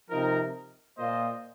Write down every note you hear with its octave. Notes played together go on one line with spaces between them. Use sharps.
C3 F3 D#4 A#4
A#2 A#3 F4 C5 D#5